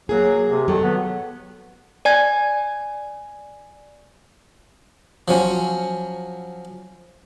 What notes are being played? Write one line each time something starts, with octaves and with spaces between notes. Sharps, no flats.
F#3 A#3 G#4
C3
D#3 F#3 A4
B3
D5 G#5 G#6
F3 F#3 C#4